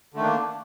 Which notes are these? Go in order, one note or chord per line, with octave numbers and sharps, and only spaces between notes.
D3 D#3 A3 A#3 D4